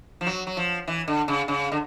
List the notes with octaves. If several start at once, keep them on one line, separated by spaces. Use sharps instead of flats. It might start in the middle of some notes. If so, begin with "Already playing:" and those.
F3
F#3
F#3
F3
E3
D3
C#3
C#3
D3